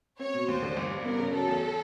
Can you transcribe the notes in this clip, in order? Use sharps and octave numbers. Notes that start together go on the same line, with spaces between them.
C4 C#5
B2
D#2 C5
D3
G1
G2
B3 A#4
C#3
F#3 A4
E2